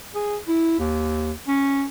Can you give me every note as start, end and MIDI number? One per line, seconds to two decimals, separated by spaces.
0.15 0.38 68
0.48 0.77 64
0.79 1.32 39
1.48 1.85 61